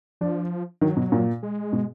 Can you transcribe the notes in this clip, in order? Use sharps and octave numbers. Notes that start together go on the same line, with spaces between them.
F3 D4
D#3 F#3
B2
A#2
G#3
B2